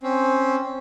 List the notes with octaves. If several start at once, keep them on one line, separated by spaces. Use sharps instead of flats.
C4 C#4